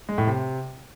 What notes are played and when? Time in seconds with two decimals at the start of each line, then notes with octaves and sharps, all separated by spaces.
0.09 G#3
0.18 A2
0.27 C3